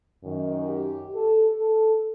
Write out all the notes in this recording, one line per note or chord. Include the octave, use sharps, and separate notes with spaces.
F#2 D#3
G4
A4
A4